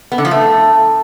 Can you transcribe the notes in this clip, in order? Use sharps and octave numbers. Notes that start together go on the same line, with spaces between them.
B3
D3
F3
A3